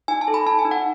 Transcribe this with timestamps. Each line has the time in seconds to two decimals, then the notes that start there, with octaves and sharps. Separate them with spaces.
0.08 D#4 G#5
0.21 A5
0.28 A4
0.34 B5
0.46 D#4 A5
0.59 G#5
0.65 D#4
0.71 F#5